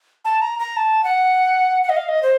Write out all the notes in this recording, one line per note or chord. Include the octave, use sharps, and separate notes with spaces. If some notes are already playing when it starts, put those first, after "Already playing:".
A5
A#5
A#5
A5
F#5
F#5
D#5
F5
D#5
C5